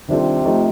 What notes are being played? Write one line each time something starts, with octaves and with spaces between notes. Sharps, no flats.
C3 D#3 G3 D4 F4 A4
F3 A3 D#4 G4